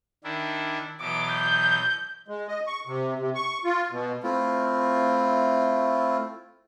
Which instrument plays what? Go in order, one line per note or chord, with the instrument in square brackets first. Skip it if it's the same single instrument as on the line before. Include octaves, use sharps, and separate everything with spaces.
[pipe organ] D#3 D4 E4
[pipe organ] B2 E3 F#3 [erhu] D6
[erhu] G6
[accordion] G#3
D#5
C#6
C3
C3
C#6
F4
B2
[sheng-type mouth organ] A3 C4 E4 F4